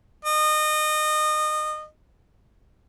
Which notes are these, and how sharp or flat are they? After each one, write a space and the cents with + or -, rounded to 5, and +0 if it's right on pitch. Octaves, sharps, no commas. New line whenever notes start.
D#5 -25